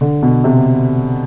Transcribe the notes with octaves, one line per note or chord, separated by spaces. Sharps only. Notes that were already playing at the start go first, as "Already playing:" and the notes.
D3
B2
C3